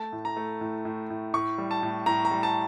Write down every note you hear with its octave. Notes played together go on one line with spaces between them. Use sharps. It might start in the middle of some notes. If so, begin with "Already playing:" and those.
Already playing: A3 A5
A2
A#5
A3
A2
A2
A2
A2 C#6
G3
A5
A2
A2 A#5
A#5
G3
A5